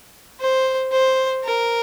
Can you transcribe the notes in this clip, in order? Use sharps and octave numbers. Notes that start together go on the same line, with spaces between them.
C5
C5
A#4